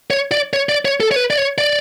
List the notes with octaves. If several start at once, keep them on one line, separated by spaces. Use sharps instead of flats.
C#5
D5
C#5
D5
C#5
A4
C#5
B4
D5
C#5
D5